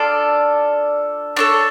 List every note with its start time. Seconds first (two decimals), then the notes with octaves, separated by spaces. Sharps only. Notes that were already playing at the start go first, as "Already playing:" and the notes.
Already playing: D4 F4 A4 D5
1.36 D4 F4 A4 C#5